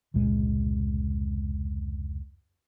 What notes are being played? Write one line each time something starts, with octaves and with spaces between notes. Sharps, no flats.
F1 C#2 A#2 G#3